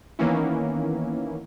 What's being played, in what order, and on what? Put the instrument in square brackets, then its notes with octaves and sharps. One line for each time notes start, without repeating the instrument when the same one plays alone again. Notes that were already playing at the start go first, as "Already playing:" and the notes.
[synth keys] D#3 E3 A#3 B3 C#4 E4